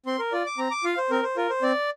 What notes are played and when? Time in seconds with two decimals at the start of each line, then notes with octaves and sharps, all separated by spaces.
0.06 C4 C6
0.19 A#4
0.32 F4 D5
0.46 D6
0.58 C4 A#5
0.71 D6
0.84 F4 F5
0.97 C5
1.11 C4 A#4
1.23 C5
1.37 F4 A#4
1.50 C5
1.62 C4 D5